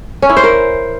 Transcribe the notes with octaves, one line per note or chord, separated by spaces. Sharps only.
C#4
E4
C5
A#4